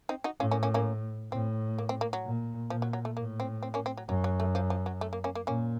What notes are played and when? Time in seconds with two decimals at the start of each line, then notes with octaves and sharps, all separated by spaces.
0.09 C4 D#4
0.24 D#4 F#4
0.40 A2 C#4 F4
0.51 A#3 C#4
0.63 A#3 C#4
0.74 A#3 C#4
1.32 A2 C4
1.78 A#3
1.89 C4
2.01 A#3
2.13 F#3
2.24 A#2
2.70 A#2 F3
2.82 F#3
2.93 F#3
3.05 A3
3.17 A2 A#3
3.40 C4
3.63 C4
3.74 A#3 C#4
3.86 C4
3.97 F#3
4.09 F#2 F#3
4.24 F#3
4.40 A3
4.55 F3
4.70 F3
4.86 F#3
5.01 A3
5.13 A#3
5.24 A#3 C#4
5.35 A#3
5.47 A#2 A#3 C#4